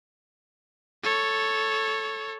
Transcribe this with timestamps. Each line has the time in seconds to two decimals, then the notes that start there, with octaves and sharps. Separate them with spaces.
1.03 A4 C#5